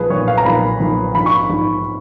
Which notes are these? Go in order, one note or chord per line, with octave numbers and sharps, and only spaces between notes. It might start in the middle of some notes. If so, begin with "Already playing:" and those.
Already playing: B1 A#2 F3 G#4 B4
B1 A#2 F3 C#5
F5
A#5
B1 A#2 F3 B5
B1 A#2 F3
A#1 G#2 F3 B5
C#6
A#1 G#2 F3